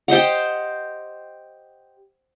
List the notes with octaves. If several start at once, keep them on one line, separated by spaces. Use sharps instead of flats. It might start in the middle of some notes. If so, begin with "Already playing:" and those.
G4 C5 D#5 F#5